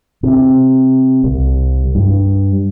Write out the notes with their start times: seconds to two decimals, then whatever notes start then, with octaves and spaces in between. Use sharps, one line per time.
0.23 C3
1.24 C2
1.95 G2